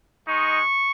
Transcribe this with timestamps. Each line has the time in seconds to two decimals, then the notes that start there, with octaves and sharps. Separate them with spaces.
0.25 G#3 D#4 C#6